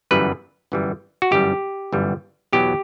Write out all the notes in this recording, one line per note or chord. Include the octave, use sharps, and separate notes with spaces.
G1 F#2 E3 G3 B4
G1 F#2 E3 G3
F#4
G1 F#2 E3 G3 G4
G1 F#2 E3 G3
E2 B2 F#3 G4